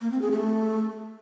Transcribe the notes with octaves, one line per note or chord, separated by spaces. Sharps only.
A#3
C4
G#4
A3